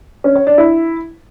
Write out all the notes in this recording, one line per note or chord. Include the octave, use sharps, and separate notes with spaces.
C#4
C#5
D4
E4